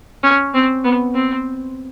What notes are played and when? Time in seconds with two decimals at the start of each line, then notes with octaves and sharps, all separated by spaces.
0.23 C#4
0.54 C4
0.84 B3
1.14 C4